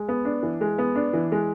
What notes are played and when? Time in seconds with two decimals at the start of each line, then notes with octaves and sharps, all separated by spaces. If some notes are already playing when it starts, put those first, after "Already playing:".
Already playing: G#3
0.09 B3
0.25 D4
0.43 E3
0.61 G#3
0.78 B3
0.96 D4
1.13 E3
1.32 G#3